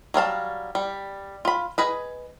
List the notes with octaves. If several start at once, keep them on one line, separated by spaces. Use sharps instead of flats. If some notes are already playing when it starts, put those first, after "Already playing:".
F#3 G3 F5 A5
G3
F4 B5
G#4 B4 D#5